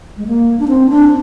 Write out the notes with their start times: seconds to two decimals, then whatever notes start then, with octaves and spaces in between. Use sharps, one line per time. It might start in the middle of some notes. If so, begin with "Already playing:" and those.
0.18 G#3
0.27 A#3
0.59 D4
0.68 C4
0.89 D4